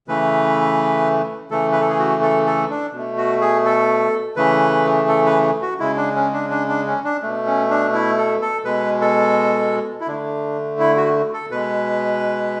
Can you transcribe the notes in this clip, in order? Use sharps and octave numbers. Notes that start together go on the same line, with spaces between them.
C#3 E3 A3 B4
C#3 E3 A3 A4
B4
A4
G#4
F#4
A4
A4
D4
B2 A3
F#4
G#4
A4
C#3 E3 A3 B4
A4
B4
F#4
C#3 G#3 E4
D4
C#4
D4
D4
D4
C#4
D4
B2 A3
C#4
D4
E4
A4
A4
B2 G#3 B4
A4
E4
D3 A3 D4
E4
F#4
A4
B2 G#3 B4